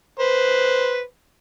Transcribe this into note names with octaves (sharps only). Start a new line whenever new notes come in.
B4 C5